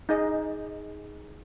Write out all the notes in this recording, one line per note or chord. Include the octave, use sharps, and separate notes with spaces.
D#4 G#4 D#5